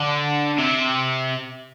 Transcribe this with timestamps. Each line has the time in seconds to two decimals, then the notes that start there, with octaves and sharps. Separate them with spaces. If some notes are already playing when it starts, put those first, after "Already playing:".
Already playing: D3
0.58 C3